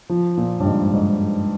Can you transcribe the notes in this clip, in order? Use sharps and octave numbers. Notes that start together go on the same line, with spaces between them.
F3
A#2
G2
G#2
G#2